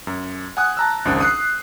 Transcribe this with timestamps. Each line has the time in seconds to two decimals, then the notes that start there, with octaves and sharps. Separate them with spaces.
0.07 F#2
0.57 F#5 G#5 D#6 F#6
0.77 A5 A#5 E6
1.05 G#1 C#2 F#2 D4 C5 D#6
1.20 D#6 F#6 C7